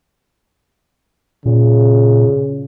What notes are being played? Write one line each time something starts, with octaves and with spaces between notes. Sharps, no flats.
A#2 C#3